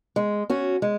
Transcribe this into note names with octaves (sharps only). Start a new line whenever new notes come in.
G#3
C#4 F#4
G#3